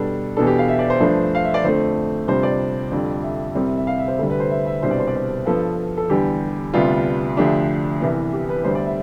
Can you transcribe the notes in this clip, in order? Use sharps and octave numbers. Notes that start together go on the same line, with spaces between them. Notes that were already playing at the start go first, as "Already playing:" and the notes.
Already playing: B2 G3 B3 D4 A4
E2 B2 B3 D4 A4
G4
F5
E5
D5
C5
G2 F3 A3 D4
F5
E5
D5
F2 D3 A3 C5
F2 C3 G3 D4 C5
D5
F2 D3 G3
E5
C2 C3 G3 C4
E5
F5
E5
C5
D2 D3 G3 A4
B4
C5
E5
E5
C2 B2 G3 D4 C5
D5
C5
D5
C5
G2 F3 B3 A4
A4
E2 D3 G3 G4
D2 C3 G3 B3 D4 F4
D2 D3 F3 A3 D4 G4
C2 C3 E3 B3
G4
B4
D2 D3 G3 B3 C5
D5
E5